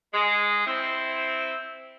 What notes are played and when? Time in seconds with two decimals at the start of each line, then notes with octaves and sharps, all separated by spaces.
0.13 G#3
0.66 C4 E4